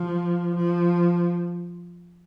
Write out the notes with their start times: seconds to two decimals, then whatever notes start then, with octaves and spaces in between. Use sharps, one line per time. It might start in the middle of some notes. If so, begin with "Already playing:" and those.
Already playing: F3
0.56 F3